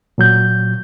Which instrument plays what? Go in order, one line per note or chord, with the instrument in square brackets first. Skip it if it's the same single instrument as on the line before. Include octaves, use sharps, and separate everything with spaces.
[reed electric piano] A#2 F#3 G6